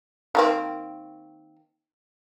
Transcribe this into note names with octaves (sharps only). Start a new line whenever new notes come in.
D#3 A#3 C4